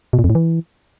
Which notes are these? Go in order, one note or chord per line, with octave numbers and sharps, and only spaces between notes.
B2
A#2
F2
A2
E3